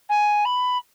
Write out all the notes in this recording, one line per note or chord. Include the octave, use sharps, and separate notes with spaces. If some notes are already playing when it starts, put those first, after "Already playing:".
G#5
B5